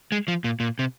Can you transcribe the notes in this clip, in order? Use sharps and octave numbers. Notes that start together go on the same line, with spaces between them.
G#3
F3
A#2
A#2
C3